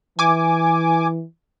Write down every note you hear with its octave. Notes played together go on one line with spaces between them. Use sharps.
E3 G#5 D6